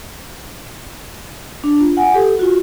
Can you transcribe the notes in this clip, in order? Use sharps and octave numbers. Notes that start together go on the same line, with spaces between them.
D4
F4
F#5 G#5
G4 A4
F4 F#4